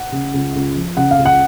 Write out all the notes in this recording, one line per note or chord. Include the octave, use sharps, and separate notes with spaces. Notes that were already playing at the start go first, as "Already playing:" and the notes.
Already playing: F#5
C#3
C#2
C#2
F3
C#3 F#5
F5
C#2
F#5